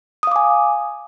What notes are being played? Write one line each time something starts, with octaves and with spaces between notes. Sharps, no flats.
F5 G#5 D6 D#6